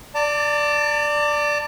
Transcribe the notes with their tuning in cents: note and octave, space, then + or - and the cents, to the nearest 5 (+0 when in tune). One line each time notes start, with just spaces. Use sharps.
D5 +0 A5 +40